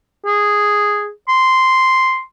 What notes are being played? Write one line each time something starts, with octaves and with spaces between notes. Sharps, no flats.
G#4
C6